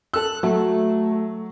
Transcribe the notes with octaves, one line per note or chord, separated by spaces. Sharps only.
A4 E6 F#6
F#3 A3